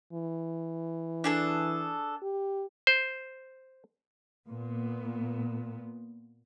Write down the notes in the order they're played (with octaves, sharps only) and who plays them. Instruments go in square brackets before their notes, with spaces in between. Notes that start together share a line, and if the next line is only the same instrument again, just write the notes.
[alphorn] E3
[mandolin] D4 G#4 A4
[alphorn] G4
[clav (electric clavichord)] C5
[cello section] A#2 B3